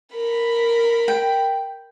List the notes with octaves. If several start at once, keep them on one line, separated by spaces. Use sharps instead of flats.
A#4 B5
G5